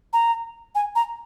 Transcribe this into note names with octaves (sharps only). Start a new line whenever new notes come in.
A#5
G#5
A#5